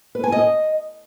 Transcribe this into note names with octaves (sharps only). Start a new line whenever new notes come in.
B4
G#5
D#5